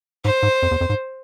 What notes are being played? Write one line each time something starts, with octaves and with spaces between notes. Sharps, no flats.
G#2 C5
G#2
F2
E2
F2
G#2